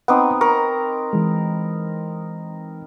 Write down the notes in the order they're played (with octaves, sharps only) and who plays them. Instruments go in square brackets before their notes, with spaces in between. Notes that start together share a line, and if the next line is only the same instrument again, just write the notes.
[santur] B3 C4 D#4 [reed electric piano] F#5 D6
[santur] A#4 [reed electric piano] C#6
[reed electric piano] E3 G#3